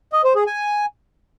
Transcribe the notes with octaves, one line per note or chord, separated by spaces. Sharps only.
D#5
C5
G#4
G#5